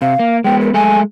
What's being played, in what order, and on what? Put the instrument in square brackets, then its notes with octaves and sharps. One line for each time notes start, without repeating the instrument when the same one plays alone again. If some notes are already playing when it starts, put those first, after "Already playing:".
[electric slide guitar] C3 [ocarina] F5
[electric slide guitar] A#3
[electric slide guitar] G#3 B3 [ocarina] G5
[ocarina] A#4
[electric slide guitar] G#3 A3 A4 [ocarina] G#5